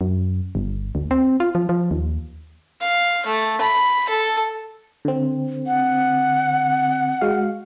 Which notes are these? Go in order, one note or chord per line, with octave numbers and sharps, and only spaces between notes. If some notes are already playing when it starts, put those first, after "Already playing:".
F#2
G1
D2
C4
F4
F3
F3
D#2
F5
A3
B5
A4
D3 C4
F#5
G#3 F#4 F5